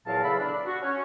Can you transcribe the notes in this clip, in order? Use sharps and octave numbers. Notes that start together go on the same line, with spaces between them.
E2 A#2 F#3 A#4 F5 A5
E2 C#3 A4 E5 B5
D4
F#4
C#4